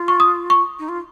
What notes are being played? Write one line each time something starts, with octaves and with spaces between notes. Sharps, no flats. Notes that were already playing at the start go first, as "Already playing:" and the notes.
Already playing: F4
C#6
D#6
C#6
D#4
F4